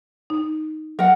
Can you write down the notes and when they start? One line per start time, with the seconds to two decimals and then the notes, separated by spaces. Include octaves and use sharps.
0.30 D#4
0.99 F#3 A#4 F#5